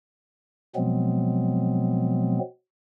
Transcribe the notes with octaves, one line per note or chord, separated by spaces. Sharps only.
B2 F3 F#3 G#3 B3 C4